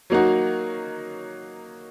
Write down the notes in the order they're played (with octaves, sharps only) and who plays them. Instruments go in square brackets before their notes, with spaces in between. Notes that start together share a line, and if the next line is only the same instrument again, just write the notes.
[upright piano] F#3 A#3 D#4 F#4